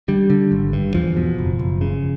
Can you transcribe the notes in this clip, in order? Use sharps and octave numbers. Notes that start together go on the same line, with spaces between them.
D3 G3
D3
G#1
G2
E2 F3
B2
F#1
F#1
C#3